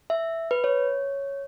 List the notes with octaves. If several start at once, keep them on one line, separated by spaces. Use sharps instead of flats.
E5
B4
C#5